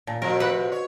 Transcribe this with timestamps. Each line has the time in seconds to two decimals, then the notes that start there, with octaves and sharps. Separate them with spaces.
0.07 A#2 A5
0.22 C3 F3 F#4 A#4 C5 D#5
0.40 B4 F#5
0.72 C#5